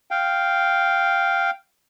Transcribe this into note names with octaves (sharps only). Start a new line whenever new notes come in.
F5 G5